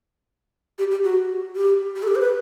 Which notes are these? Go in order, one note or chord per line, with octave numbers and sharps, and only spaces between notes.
G4
G4
F#4
G4
G4
A4
G4
C5
B4